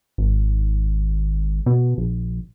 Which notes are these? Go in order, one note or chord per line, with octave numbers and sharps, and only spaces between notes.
G#1
B2
A#1